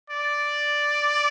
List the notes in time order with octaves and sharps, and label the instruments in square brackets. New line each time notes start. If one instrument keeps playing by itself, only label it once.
[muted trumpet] D5